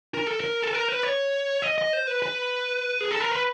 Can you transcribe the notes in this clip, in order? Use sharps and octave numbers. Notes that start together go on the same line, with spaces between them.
A#4
A4
A#4
A4
A#4
B4
C#5
D#5
D#5
C5
B4
B4
G#4
A4
A#4
B4